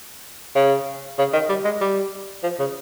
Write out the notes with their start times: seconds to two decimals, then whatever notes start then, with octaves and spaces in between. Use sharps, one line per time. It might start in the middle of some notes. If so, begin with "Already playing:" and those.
0.55 C#3
1.19 C#3
1.33 D#3
1.50 G3
1.65 G#3
1.81 G3
2.43 F3
2.59 C#3